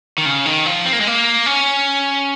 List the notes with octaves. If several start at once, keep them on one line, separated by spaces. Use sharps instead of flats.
D#3
C#3
D#3
F3
C4
A#3
G#3
A#3
C#4